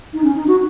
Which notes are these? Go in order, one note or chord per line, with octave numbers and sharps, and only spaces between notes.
D#4
C#4
D#4
F#4